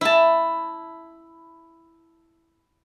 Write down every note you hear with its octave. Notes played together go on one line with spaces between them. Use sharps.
E4 A5